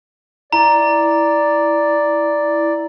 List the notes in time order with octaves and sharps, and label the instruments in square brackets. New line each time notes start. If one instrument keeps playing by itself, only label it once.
[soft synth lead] E4 [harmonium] D5 [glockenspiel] A#5